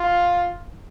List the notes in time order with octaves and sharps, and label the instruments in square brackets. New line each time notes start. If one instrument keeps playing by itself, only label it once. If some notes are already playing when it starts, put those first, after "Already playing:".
Already playing: [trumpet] F4